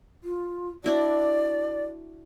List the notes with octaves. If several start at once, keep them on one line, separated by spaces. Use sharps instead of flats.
F4
D4 E4 F#4 D5